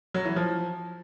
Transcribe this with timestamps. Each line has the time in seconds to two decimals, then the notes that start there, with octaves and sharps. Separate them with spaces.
0.14 F#3
0.25 E3
0.36 F3